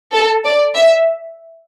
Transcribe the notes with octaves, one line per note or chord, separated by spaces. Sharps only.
A4
D5
E5